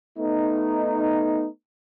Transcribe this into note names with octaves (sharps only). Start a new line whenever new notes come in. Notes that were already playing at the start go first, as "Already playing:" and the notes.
A3 B3 D#4